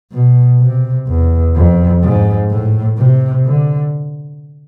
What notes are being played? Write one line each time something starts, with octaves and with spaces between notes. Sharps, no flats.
B2
C3
E2
F2
G#2
A2
C3
D3